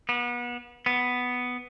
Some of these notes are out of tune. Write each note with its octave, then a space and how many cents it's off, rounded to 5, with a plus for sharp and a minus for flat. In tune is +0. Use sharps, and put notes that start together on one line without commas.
B3 -30
B3 +5